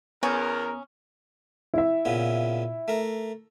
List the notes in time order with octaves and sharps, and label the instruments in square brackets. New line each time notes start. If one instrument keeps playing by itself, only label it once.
[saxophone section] E2 [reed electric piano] B3 A#5 D#6 [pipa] C#4 [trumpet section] A#4
[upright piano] E4 E5
[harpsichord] A#2 C#3 B3
A3 A#4